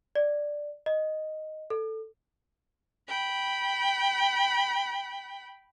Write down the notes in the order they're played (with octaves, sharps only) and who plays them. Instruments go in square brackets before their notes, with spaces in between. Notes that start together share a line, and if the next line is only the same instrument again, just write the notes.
[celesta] D5
D#5
A4
[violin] G5 B5